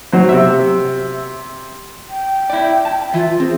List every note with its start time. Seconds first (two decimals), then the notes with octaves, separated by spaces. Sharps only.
0.13 F#3 C5
0.29 C3 E5
2.10 G5
2.50 E4 D5
2.85 A5
3.14 E3 F4 E5
3.40 C4 G#4